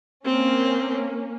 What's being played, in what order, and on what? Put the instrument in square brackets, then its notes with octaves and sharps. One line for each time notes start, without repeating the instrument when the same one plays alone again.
[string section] A#3 C#4 [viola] C4